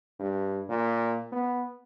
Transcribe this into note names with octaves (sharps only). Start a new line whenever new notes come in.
G2
A#2
B3